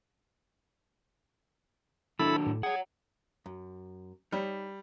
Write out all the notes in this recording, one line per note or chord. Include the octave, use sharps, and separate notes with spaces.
D#3 F#3 D4 E4 A4 B5
A2
G#4 C#5 F#5
F#2
G3 D#4 C#5 B5